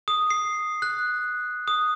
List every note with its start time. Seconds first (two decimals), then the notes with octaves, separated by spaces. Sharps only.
0.08 D#6
0.30 C7
0.82 F#6
1.68 D#6